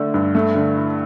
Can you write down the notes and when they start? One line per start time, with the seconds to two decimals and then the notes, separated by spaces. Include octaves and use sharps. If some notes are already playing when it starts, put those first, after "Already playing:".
Already playing: D3 A3 D4
0.14 G2
0.35 A3
0.55 D3
0.77 E4